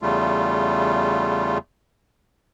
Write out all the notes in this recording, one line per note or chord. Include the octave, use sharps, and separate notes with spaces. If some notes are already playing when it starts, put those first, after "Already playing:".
E2 C#3 G3 A3 F4